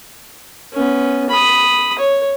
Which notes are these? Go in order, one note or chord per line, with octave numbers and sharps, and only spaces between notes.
B3 C#4
B5 D#6
C#5